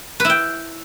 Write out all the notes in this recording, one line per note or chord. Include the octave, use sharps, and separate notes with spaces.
E4 B4 G5